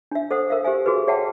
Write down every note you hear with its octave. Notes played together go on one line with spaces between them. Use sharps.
D4 E5
A4 C5 F#5 D#6
A#4 E5 F5
G4 C5 E5 G#5
F#4 G#4 A4 B4
G#4 C#5 E5 F#5 G5 A5